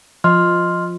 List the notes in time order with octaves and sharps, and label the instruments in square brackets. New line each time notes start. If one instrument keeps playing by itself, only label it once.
[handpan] F3 [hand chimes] D#5 C6 F6